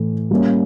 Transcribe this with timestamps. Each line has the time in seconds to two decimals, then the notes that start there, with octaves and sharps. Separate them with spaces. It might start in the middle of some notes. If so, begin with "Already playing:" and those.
Already playing: A2 E3 A3
0.31 G3 A#3 C#4